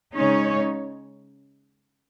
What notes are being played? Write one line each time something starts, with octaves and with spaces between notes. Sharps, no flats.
C#3 G#3 C#4 D#4 C#5